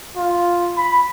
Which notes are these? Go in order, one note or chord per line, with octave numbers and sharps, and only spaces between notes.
F4
B5